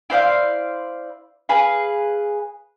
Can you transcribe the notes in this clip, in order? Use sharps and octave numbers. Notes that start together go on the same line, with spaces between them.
E4 C5 D5 F5
G#4 B4 F5